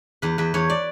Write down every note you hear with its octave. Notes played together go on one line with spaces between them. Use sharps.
E2 B4
E2 B4
E2 C#5
D5